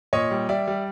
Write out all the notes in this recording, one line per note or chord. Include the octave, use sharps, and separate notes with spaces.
A#2 C#5 D#5
G3
G3 D5 E5
G3